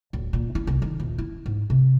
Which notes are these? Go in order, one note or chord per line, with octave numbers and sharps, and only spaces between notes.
D1
A#2
E4
C2
D#3
D#1
E4
G#2
C3